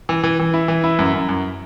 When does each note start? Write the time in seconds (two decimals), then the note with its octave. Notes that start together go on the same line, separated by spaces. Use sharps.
0.09 E3
0.23 E3
0.39 E3
0.54 E4
0.68 E3
0.84 E4
0.99 F#2
1.14 F#2
1.29 F#2